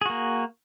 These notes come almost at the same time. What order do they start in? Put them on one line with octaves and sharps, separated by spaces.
G#4 F#4 A#3